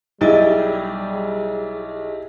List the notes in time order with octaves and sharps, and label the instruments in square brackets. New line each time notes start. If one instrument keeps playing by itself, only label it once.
[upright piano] B1 D#5 A6 [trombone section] G3 [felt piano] E4 [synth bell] G4 G#4